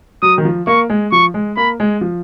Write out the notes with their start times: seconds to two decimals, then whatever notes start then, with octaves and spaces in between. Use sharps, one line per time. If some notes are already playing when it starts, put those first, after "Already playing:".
0.22 F#3 D#6
0.38 D#3
0.45 F3
0.67 A#3 C#6
0.90 G#3
1.12 F3 C#6
1.34 G#3
1.57 A#3 B5
1.80 G#3
2.01 F3